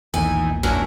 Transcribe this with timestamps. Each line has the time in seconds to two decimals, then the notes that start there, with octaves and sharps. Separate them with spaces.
0.14 E1 B1 A#2 D#3 E3 G#5
0.63 A#1 F#2 F#3 C#4 D4 E4 A#4